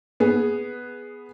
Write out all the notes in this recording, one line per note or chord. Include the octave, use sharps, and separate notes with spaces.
B3 G#4